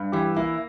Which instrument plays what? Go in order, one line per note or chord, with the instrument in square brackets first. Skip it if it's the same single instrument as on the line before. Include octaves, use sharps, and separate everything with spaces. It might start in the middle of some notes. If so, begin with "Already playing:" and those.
Already playing: [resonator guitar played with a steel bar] G2
[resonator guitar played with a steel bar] E3 [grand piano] G4
[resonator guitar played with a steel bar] A#3 [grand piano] E4